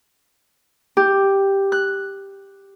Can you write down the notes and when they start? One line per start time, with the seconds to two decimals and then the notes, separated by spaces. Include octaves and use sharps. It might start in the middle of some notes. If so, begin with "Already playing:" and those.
0.97 G4
1.72 F#6